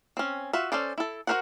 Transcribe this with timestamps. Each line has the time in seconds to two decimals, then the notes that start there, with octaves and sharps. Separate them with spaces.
0.17 C4 C#4
0.53 F4 F#4 E5
0.72 C#4 A4 C5 D5
0.98 E4 A4
1.27 F#4 A4 A#4 C5 F#5